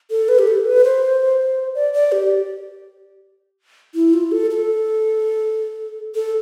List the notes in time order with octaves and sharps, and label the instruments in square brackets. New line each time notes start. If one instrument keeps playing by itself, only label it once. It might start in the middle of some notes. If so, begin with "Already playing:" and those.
[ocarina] A4
B4
G4
A4
B4
C5
D5
D5
G4
E4
F4
A4
A4
A4